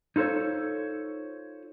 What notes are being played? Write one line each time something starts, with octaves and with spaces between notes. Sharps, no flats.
D#4 F4 A4 C5 C#5